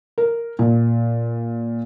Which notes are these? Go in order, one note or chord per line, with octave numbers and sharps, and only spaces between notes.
A#4
A#2